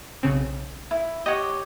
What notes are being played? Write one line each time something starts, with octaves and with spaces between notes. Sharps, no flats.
B1 C#3 C4
E4
G4 C#5 D#5 F#5 D6